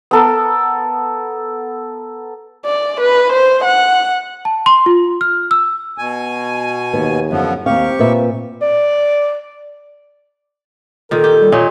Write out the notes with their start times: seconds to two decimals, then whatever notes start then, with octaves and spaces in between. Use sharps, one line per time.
0.11 B3 A4 A#4
2.65 D5
3.01 B4
3.32 C5
3.64 F#5
4.45 A5
4.66 C6
4.86 F4
5.21 F6
5.51 E6
5.98 B2 G#5
6.94 D#2 B3
7.31 F#2 D3 F3 B3
7.66 D#2 C4 G4 F5 C#6
7.99 A#2 B4 E5
8.61 D5
11.11 A#2 D#3 A4 A#4
11.24 G4
11.41 G3
11.52 A#2 D#4 C#5